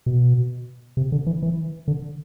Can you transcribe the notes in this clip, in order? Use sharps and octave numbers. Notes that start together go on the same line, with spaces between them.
B2
C3
D3
E3
E3
D3